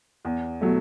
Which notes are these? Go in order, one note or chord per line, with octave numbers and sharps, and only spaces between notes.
E2
B2 F#3 A3